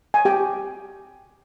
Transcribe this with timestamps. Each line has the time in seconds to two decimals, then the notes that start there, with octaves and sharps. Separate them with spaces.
0.14 G#5
0.25 G4 G5